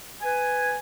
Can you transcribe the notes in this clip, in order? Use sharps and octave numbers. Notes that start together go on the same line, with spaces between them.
B4 G#5